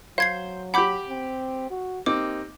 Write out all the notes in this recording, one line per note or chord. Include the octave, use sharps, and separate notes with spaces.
F#3 C5 F5 G#6 C7
G4 F#5 B5 D6 G6
C4
F#4
A#3 C4 D#4 G4 D6